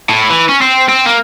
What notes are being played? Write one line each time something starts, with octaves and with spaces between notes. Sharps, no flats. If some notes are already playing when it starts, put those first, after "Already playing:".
A2
E3
C#4
C4
C4
A#3